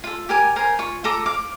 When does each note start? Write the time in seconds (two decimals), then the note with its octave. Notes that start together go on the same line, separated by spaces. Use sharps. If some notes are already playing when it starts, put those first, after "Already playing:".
0.04 F4 A4
0.29 G4 A#4 G#5
0.56 A#4 C5 G#5
0.79 F4 C#6
1.04 F4 A4 A#5 D6
1.26 F5 D6